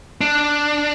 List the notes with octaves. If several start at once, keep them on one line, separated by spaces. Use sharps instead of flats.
D4